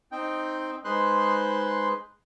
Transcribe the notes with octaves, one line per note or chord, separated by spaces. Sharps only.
C4 D#4 G5
G#3 D#4 B4 C5 C6 F#6